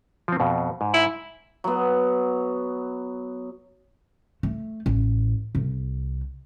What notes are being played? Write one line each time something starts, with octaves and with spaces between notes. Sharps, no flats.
F3 C4
F2 B2
G#2
E4
F#3 B3
A3
A1
C2